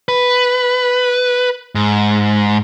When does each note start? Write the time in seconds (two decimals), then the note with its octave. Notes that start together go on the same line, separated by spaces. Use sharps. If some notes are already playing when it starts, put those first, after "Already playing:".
0.09 B4
1.75 G#2